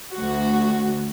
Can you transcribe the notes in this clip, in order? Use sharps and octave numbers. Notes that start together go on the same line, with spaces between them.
D2 F#4